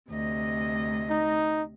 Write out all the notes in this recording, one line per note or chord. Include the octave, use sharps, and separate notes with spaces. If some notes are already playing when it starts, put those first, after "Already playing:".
D2 C3 D#5
D#4